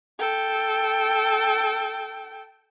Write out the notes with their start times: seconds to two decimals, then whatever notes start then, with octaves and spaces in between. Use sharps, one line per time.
0.19 A4 G5